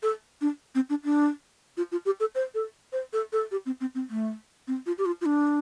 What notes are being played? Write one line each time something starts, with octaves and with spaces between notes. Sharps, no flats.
A4
D4
C4
D4
D4
F4
F4
G4
A4
C5
A4
C5
A4
A4
G4
C4
C4
C4
A3
C4
F4
G4
F4
F4
D4